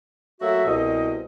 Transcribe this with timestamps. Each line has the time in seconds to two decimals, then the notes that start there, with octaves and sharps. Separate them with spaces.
0.40 F#3 A3 A#3 F#4 E5
0.65 C2 B2 D#5